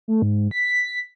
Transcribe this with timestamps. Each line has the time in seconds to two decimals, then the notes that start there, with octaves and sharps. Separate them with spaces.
0.08 A3
0.22 G#2
0.51 B6